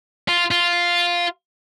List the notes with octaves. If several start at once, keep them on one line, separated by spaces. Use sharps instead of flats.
F4
F4